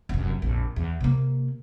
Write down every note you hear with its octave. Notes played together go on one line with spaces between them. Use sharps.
F1 F#2
A#1 F2
E2
C3 A#3